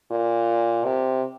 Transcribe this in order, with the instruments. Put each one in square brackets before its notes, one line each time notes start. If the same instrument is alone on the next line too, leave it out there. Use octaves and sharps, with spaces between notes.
[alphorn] A#2
C3